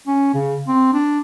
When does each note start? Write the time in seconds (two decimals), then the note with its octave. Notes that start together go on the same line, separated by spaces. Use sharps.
0.07 C#4
0.34 C#3
0.68 C4
0.93 D4